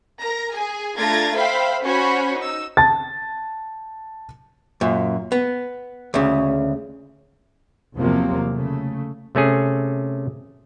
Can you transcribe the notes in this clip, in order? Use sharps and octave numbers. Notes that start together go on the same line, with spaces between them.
A#4 A#5
G#4 G#5
A3 D4 F4 A#5 G#6 A6
C5 E5 F5 G5 B5
C#4 F#4 C5 C#5 G#5 B5
D#4 E6
A5 A6
F#2 A#2
B3
D2 C#3
E2 C3 F3 F#3 A#3
C#3 A3
C3 A3 C#4 G#4